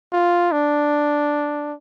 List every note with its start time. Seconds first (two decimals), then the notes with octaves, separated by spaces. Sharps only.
0.13 F4
0.52 D4